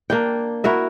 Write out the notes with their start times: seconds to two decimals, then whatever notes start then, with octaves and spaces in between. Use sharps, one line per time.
0.10 A#3 D4 G5
0.64 E4 F#4 A#4 E5